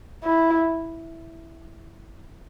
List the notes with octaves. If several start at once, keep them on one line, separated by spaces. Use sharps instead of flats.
E4